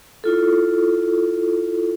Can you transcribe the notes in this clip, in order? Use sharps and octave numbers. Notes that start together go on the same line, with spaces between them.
E4 F4 A4